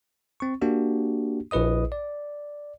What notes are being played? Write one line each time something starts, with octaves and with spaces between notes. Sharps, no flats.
C4 C#6
A#3 D4 F#4 G4
A#1 E4 B4 D#5 D#6
D5